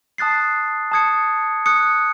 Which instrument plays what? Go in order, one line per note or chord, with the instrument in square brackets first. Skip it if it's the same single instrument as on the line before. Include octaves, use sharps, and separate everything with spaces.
[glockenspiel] A5 D#6 F#6 A6 C7
A5 D#6 G#6 C#7
D#6 F#6 C#7